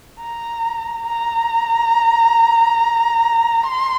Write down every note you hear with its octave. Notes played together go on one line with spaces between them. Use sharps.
A#5
A#5
C6